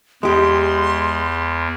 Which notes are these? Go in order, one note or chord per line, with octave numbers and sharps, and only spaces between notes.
E2 G#3 G4 C6